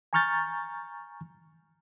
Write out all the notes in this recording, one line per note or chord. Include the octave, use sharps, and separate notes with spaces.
G#5 A#5 C#6 F6 G6 A6